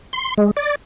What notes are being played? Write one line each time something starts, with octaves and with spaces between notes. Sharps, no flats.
C6
G#3
D5